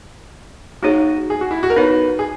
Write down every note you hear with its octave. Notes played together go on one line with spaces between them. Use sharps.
A#3 D#4 F#4 G#4 C#5
G#4
F#4
E4
F#4
A#4
B3 D#4 F#4 B4 C#5
G#4